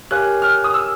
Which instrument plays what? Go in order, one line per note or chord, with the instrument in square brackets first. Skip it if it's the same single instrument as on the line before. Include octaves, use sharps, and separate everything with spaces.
[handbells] G4 A#4 C#5 F5 G#5 [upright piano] F#6
[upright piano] F6
D#6
E6